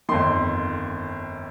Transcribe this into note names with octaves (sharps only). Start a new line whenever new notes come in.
G1 F2 D#3 C6